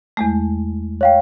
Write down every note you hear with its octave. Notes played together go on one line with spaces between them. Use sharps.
E2 G#3 A3
C#5 F5 G5